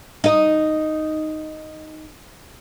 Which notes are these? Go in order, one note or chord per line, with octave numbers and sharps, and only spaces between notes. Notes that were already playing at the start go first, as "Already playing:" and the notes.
D#4 D#5